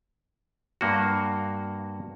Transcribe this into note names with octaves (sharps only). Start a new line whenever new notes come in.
G2 A#3 F#4